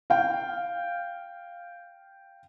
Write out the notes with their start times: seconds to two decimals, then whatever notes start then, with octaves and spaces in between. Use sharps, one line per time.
0.10 F5 G5